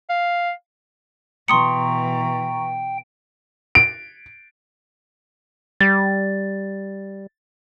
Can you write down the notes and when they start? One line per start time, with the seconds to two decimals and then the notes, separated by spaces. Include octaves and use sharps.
0.09 F5
1.48 B2 E3 G5 A#5 C6 C#6 D#6 C#7
3.75 D7
5.81 G3 A6